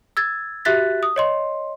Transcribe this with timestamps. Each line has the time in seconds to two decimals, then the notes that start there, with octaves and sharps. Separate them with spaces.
0.17 E6 G#6 A6
0.65 F#4 G4 E5 F#6 A6 B6
1.03 D#6
1.16 C#5 D#5 C6